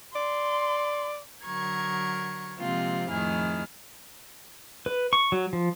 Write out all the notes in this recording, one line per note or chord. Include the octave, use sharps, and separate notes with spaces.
D5 C6
D3 F#3 A#4 C#6 G#6
C3 F3 G#3 A#3 C4 F4
F2 A2 D#3 E4 G#4 F6
B4
C#6
F#3
F3